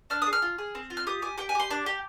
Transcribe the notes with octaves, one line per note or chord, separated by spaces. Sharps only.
D4 F6
G#4 D#6
F6
F4
G#4
C4
F4
F6
G4 D#6
G4 G#5
G4 G5
G#5
G4 C6
D4 D6
G4